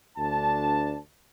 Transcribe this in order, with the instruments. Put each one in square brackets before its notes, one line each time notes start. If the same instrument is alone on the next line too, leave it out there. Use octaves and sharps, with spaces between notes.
[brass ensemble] D2 D4 A5